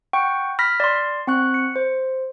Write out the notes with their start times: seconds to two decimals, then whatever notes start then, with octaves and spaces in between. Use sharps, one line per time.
0.13 F#5 G5 C#6
0.59 B5 F6 A#6 B6
0.80 D5 C6
1.27 C4 F#5 C#6 F#6
1.54 C#7
1.76 C5